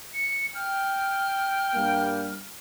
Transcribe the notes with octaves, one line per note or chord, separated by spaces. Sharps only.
C#7
G5 F6
G2 G3 A#3